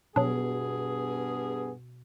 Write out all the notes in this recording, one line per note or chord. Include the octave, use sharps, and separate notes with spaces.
G2 B2 F#3 B3 D4 G#4